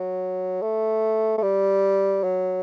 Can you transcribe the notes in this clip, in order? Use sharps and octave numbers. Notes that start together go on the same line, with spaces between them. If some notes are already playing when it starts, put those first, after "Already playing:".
Already playing: F#3
A3
A3
G3
F#3